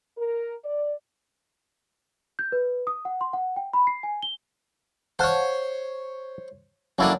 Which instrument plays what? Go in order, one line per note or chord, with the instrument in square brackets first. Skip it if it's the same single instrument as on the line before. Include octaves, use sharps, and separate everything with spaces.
[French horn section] A#4
D5
[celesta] G6
B4
D#6
F#5
C6
F#5
G5
B5
C7
G#5
G7
[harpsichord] C5 C#5 [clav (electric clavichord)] F5 F#5 A5
[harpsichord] F#3 A#3 D4 [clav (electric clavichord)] C#4 E4 A4